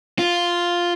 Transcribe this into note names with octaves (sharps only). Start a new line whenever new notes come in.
F4